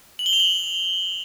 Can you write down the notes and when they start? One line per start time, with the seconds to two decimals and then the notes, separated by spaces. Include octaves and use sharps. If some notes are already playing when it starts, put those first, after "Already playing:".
0.19 F#7
0.26 G7
0.33 F7
0.40 F#7